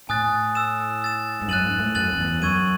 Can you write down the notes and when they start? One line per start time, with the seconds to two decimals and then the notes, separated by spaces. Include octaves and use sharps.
0.09 A2 G#5 D#6 F#6 A6
0.55 E6 A6 E7
1.02 E6 A6 E7
1.42 G#2
1.48 F#2 F#6 A6 D#7 F#7
1.64 G#2
1.80 A2
1.95 F#2 F#6 A6 D#7 F#7
2.13 F#2
2.18 E2
2.42 F#2 C#6 E6 G#6 D#7 F#7